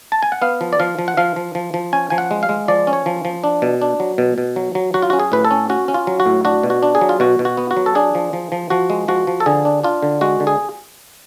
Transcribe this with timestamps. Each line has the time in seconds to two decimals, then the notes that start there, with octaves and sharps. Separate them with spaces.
0.12 A5
0.23 G#5
0.32 F#5
0.42 B3 F5
0.61 F3
0.73 D5
0.80 F3 F5
0.99 F3
1.08 F#5
1.17 F3 F5
1.36 F3
1.55 F3
1.74 F3
1.93 C#4 G#5
2.10 F3 G#5
2.18 F#5
2.31 G#3
2.43 F5
2.49 G#3
2.68 F3 D5
2.87 C#4
2.93 C#5
3.06 F3
3.25 F3
3.44 D4
3.62 B2
3.82 D4
4.00 F#3
4.18 B2
4.38 B2
4.56 F#3
4.75 F#3
4.94 F#3 F#4
5.02 F4
5.10 C#4 F#4
5.20 G#4
5.32 A2 B4
5.45 A4
5.51 C#4
5.70 C#4 F#4
5.88 C#4
5.94 F4
6.07 F#3
6.20 F#4
6.26 A2
6.45 D4 F#4
6.63 B2
6.70 F#4
6.82 D4
6.95 G#4
7.01 F#3
7.09 F4
7.20 B2 F#4
7.39 B2
7.45 F#4
7.57 B3
7.71 F#4
7.77 F#3
7.86 A4
7.95 D4 G#4
8.15 F3
8.33 F3
8.52 F3
8.70 F3 F#4
8.90 G#3
9.08 F3 F#4
9.27 F3
9.40 A4
9.46 D3 G#4
9.65 D4
9.83 D4 F4
10.03 D3
10.21 G#3 F#4
10.40 D3
10.47 G#4